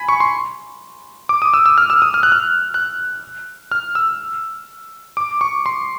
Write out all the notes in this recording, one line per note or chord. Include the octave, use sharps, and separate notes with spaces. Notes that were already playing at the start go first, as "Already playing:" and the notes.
Already playing: G#5 B5
C#6
C6
D6
D#6
E6
E6
F6
E6
D#6
F6
F#6
F6
F#6
F6
E6
D6
C#6
C6